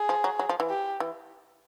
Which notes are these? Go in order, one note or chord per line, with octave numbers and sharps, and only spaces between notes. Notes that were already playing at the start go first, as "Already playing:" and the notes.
Already playing: G#4
F3
F#3
F#3
F3
E3
G4
E3